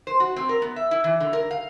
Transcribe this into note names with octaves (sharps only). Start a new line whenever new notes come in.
C5
F#4
C4
A#4
B3
E5
E4
E3
D3
A#4
F5